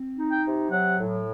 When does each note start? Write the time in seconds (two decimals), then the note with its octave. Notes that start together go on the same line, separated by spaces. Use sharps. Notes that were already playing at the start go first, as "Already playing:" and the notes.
Already playing: C4
0.18 D#4
0.31 G5
0.45 C3
0.70 F#3 F#5
0.97 A2